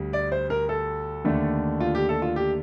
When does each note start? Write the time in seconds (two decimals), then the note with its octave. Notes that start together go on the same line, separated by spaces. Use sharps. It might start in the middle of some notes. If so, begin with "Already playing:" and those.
Already playing: D2 G3
0.13 D5
0.32 C5
0.50 A#4
0.69 A4
1.25 D#2 D3 A3
1.80 F4
1.95 G4
2.09 A4
2.22 F4
2.36 G4